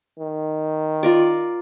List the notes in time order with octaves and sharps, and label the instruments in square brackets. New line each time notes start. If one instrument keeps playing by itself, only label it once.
[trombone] D#3
[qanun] F4 A#4 D5